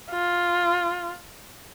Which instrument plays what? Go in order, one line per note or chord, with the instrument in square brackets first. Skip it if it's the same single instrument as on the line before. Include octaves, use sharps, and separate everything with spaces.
[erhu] F4